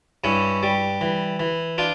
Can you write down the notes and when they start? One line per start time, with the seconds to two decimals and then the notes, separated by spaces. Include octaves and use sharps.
0.24 G2 C#4 E4
0.63 G3
1.01 E3
1.40 E3
1.78 D4 F4